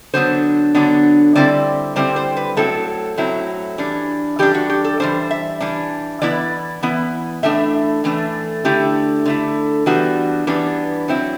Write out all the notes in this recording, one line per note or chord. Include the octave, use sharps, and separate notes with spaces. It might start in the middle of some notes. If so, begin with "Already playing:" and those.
D3 F#3 B3 D4 C5
D3 F#3 B3 D4
D3 G3 C4 E4 D5
D3 G3 C4 E4 C5
C5
B4
A2 F#3 C4 E4 A4
A2 F#3 C4 E4
E3 G3 D4
E3 G3 D4 G4
F#4
G4
A4
E3 G3 D4 C5
E5
E3 G3 D4
E3 B3 E4 D5
E3 B3 E4
A2 E3 A3 D4 E5
A2 E3 A3 D4
D3 A3 E4 G4
D3 A3 E4
E3 G3 B3 D4 F#4
E3 G3 B3 D4
F#3 C4 E4